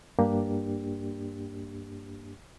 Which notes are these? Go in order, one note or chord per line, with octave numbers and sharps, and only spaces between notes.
G2 A#3 D4 G4